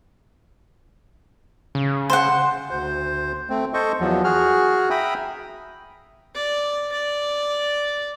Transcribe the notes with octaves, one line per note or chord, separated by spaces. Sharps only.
C#3
C5 F#5
D2 C5
A3 C4
A4 C5 D#5 C#6
E2 F3 F#3
F#4 G#4 F6
E5 G5 A#5 B5 D#6
D5
D5